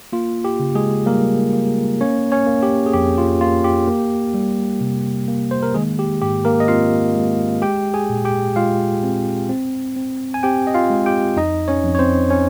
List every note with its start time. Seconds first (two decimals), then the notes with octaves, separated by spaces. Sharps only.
0.12 A#3 F4
0.45 G4
0.60 C#3
0.75 G#3 G#4
1.06 G3 A#3 A#4
1.53 A#3
2.01 A#3 C#4 C#5
2.32 C#4 C#5
2.47 A#3
2.63 G4
2.86 G#4
2.94 F2 G4
3.18 F4
3.41 A#3 F4
3.64 G4
3.87 A#3
4.34 G3
4.81 C3
5.28 A#3
5.51 C5
5.63 A#4
5.74 D#3 G#3 G#4
5.99 G4
6.22 G#2 G4
6.45 A#3 A#4
6.60 D#5
6.68 C4 F4 F5
7.15 G#3
7.62 G#3 G4 G5
7.94 G#4 G#5
8.09 A#2
8.25 G4 G5
8.56 G#3 F4 F5
9.03 C4
9.49 C4
9.96 C4
10.34 G#5
10.43 C4 G4 G5
10.67 D#5
10.74 F4 F5
10.90 G#3
11.06 G4 G5
11.37 F2 D#4 D#5
11.68 C#4 C#5
11.84 F2
11.95 C#5
11.99 C4 C5
12.30 C#4 C#5